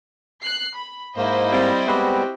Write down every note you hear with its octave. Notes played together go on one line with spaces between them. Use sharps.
F#6 C7
B5
G#2 A#3 E4 C5 D#5
G3 C4
G3 G#3 B3 C4 F#4 G4